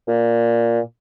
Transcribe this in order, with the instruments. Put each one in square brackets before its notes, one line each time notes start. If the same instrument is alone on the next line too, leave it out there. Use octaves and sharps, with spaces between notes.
[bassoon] A#2